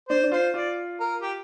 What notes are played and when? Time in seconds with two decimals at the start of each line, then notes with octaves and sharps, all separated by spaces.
0.09 D4 C5
0.24 D4
0.32 F4 C5
0.54 F4 D5
1.00 A#4
1.22 G4